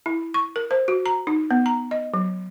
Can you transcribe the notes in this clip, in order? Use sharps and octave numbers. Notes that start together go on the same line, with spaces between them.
E4
C#6
A#4
C5
F#4
A#5
D#4
B3
A#5
D#5
F#3